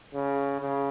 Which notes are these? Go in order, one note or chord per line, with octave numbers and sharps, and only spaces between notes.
C#3
C#3